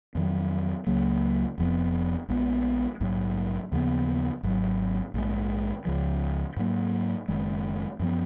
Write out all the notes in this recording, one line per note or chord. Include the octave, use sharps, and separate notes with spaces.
F2 D#3 F#3
C#2 C#3 F#3 A#3
F1 F2 F3 B3
A#1 A#2 G#3 B3
A#1 G#2 F#3
D#2 C#3 F3 B3
G#1 G#2 F#3
A#1 G#2 F3 G#3
C#2 C#3 F3
G#2 F#3 A#3
F#1 F#2 D#3 G#3
F#2 F3 B3